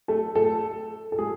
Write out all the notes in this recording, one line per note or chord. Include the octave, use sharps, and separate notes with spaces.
A3 A4
A3 A4
A4
G#3 G#4